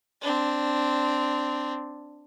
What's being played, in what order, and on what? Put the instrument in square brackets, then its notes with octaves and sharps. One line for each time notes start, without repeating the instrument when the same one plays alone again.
[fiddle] C4 D4